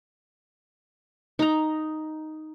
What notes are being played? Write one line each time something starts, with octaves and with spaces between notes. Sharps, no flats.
D#4 A#5